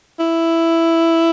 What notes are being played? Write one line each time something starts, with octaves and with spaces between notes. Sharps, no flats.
E4